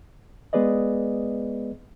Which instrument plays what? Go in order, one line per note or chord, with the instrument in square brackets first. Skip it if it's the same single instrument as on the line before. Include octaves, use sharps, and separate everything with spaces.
[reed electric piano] G#3 B3 G#4 B4 D5 D#5